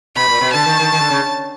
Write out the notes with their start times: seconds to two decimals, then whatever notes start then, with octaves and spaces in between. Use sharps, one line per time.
0.15 B2 B5
0.28 A#2
0.41 B2
0.53 D3 A5
0.66 D#3
0.80 D#3
0.92 D#3
1.01 D3
1.10 C#3